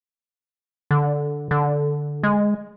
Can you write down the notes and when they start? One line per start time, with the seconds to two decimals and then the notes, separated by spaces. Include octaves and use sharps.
0.91 D3
1.51 D3
2.23 G#3